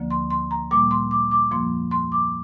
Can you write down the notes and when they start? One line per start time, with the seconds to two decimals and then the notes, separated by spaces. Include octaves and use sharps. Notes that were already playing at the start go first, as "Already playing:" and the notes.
Already playing: D2 D3 F3 A#3
0.11 C6
0.31 C6
0.51 A#5
0.71 A#2 G3 A#3 D6
0.91 C6
1.11 D6
1.31 D6
1.51 F2 F3 A#3 C6
1.91 C6
2.12 D6